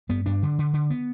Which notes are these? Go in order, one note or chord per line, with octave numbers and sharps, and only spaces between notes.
G2 B3
G2 D4
D3
D3
D3
B3